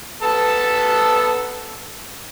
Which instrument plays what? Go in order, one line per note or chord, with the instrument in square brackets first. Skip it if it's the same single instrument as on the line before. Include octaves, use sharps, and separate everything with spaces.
[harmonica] B3 A4 A5